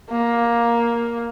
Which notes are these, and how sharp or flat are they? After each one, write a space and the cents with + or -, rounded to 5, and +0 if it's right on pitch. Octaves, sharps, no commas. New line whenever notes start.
A#3 +10